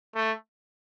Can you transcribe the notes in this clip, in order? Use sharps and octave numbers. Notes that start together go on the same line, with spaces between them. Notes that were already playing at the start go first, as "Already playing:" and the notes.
A3